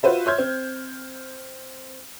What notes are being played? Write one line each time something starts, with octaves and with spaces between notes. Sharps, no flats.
F4 F#4 B4 C5 E5
C#5 E5 C6 F6 G6 G#6
C4